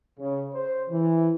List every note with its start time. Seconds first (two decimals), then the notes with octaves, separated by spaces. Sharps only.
0.19 C#3
0.55 C5
0.90 E3